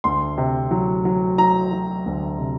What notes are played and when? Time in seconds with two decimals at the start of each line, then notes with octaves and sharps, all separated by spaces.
0.04 D2 C6
0.37 C3
0.71 F#3
1.05 F#3
1.38 F#3 A#5
1.72 F#3
2.06 D2
2.39 C3